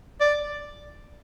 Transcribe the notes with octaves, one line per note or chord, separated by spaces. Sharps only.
D5